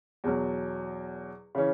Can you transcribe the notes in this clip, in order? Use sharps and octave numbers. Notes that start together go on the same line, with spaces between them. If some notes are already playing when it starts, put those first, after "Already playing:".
E2 B2 F#3
C#3 E3 C#4